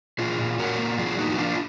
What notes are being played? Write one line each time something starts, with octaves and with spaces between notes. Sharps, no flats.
A#2 F4 G#4
A#2
A#2 F#4 A#4
A#3
F#3 F4 G#4
A#3 D#4 F#4
F#4
A#3 D4 F4